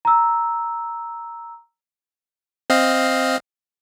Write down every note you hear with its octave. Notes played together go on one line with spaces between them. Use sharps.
A#5 E6
C4 D#5 F5